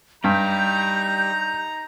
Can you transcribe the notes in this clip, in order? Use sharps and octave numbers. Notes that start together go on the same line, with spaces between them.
G2 G3 D#4 G5 A#5 G6